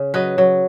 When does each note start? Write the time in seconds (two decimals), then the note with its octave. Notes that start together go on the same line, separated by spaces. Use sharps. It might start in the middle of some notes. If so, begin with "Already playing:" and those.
Already playing: C#3
0.14 F#3 B4 D#5
0.38 F#3